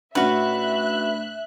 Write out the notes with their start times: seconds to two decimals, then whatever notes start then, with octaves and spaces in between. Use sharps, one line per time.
0.15 A2 C#4 D4 F#4 B4 E5 F#6